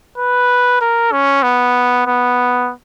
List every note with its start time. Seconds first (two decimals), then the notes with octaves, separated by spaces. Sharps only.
0.18 B4
0.81 A#4
1.12 C#4
1.43 B3
2.07 B3